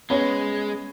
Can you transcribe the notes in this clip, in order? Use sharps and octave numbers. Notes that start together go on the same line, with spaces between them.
G#3 B3 C#4